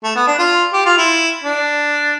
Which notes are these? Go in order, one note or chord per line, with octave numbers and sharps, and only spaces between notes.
A3
B3
D4
F4
G4
F4
E4
D4